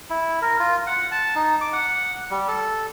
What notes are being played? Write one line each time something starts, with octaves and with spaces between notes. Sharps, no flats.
E4
A#4
F4
F#5
A5
D#4
D6
F#5
G3
A4